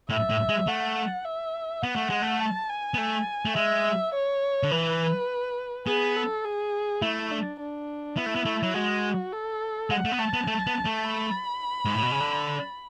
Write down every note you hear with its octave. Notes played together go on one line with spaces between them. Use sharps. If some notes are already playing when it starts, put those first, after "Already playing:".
A2 E5
A2
G#3
A3 F#5
E5
B3 F#5
A3
G#3
A3
A5
G#5
B3
A3
A3
G#3 E5
C#5
D3
E3 B4
B3 G#4
A4
G#4
A3 E4
D4
D4
B3 E4
A3
B3
A3
F#3
G#3 F#4
A4
G#3 F#5
A3
B3
A3 A5
B3
A3
B3
A3
B5
G#2
A2
B2
C#3
D3